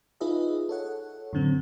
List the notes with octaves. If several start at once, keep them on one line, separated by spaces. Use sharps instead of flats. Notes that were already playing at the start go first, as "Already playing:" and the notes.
D#4 F4 G#4 B4 D#5 E5
A4 C#5 F#5
F#2 A2 D3 C4